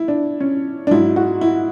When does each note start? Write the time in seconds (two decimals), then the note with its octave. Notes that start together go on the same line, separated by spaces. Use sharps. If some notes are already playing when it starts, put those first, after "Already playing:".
Already playing: E4
0.08 D4
0.40 C#4
0.87 D4
0.91 G#2 F#3 E4
1.16 F#4
1.41 E4